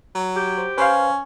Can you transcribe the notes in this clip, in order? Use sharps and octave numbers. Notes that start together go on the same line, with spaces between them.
F#3
G4
C5
C#4 B4 C5 F5